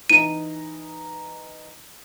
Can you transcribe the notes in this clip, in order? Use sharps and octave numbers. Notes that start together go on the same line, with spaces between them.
E3 D#4 D#7